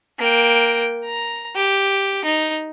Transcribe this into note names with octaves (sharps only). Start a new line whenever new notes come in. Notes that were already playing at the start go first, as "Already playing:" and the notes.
A#3 G5
A#5
G4
D#4